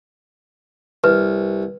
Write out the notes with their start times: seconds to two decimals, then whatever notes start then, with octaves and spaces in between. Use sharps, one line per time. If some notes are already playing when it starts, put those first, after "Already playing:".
1.04 C2 B4